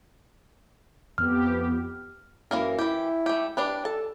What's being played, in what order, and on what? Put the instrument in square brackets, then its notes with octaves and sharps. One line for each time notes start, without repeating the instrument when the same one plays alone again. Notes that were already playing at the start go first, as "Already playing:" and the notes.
[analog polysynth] F2 B3 G4 [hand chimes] F6
[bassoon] F#2 [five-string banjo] E3 A#3 A#4
[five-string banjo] E3 G4 [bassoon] E4
[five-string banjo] A3 G4
D4 G4 B4
[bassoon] A4 [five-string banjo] A5